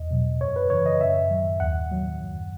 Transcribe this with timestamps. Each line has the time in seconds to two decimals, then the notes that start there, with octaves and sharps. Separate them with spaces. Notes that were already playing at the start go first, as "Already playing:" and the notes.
Already playing: E2 D#5
0.11 B2 F#3
0.41 F#2 C#5
0.56 B4
0.70 C#3 E3 C#5
0.86 D#5
1.01 F#2 E5
1.31 D#3 F#3
1.60 D#2 F#5
1.91 D#3 F#3
2.20 F#2